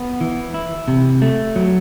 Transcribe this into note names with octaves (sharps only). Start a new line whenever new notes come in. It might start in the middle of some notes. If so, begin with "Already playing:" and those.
Already playing: B3
E3
E4
C3
A3
F#3